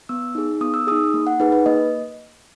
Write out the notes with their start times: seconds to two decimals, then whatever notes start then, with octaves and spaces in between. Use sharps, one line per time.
0.09 B3 E6
0.35 D#4 G#4
0.61 B3 D#6
0.74 E6
0.87 G#4 D#6
0.91 D#4
1.14 A#3
1.27 F#5
1.40 D#4 G#4 B4
1.52 B4
1.66 A#3 D#5